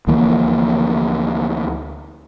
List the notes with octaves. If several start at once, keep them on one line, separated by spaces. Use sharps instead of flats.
D2 E3 F3 A#3